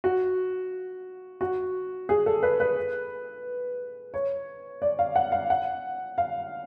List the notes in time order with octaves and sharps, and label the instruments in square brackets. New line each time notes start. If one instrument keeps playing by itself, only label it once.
[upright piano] F#4
F#4
G#4
A4
B4
B4
C#5
D5
F5
F#5
F5
F#5
F5